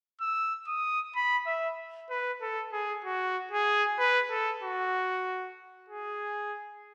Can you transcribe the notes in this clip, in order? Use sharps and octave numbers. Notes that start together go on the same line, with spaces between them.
E6
D#6
B5
E5
B4
A4
G#4
F#4
G#4
B4
A4
F#4
G#4